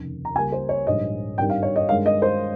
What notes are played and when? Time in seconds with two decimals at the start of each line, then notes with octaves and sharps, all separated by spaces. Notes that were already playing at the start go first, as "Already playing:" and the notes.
Already playing: F1 D#2 C#3
0.25 A#5
0.35 C#2 C#3 G3 A#3 G#5
0.52 C5
0.69 C#5
0.86 A#1 G#2 D#3 G3 D#5
1.38 G#1 G2 D#3 G3 G5
1.50 F5
1.62 C#5
1.76 D#5
1.89 G2 D#3 G#3 F5
2.06 D#5
2.22 C5